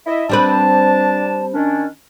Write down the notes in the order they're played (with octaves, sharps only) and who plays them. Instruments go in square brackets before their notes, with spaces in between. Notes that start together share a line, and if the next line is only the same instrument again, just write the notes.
[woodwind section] E4 D#5 E5
[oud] G3 C4 B4 [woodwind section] D4 A5
[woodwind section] D#3 C#4 D4